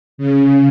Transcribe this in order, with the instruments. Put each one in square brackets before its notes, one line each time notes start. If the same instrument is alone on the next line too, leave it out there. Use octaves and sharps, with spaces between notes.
[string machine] C#3